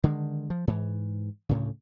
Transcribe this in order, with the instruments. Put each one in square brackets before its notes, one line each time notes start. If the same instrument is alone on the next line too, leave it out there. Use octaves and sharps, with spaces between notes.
[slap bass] D3 D#3 G#3
F3
G#2 E3
D2 A2 C#3